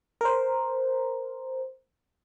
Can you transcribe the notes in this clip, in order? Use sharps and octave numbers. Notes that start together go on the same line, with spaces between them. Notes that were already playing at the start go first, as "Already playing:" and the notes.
A#4 C5